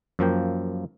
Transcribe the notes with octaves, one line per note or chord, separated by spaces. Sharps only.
F#2 F3 A#3 G5